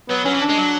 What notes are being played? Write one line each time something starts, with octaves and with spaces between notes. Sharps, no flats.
F#3 B3
F#3 C#4
E3
D4
G#3
F#3